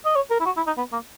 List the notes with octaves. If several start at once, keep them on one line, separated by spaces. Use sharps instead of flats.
D#5
C#5
A#4
E4
F#4
E4
D#4
B3
A#3